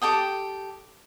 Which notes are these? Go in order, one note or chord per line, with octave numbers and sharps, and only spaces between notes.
G4 A4 G5 D#6